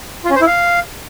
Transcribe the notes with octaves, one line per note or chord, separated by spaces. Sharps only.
F4
C#4
C5
E4
F5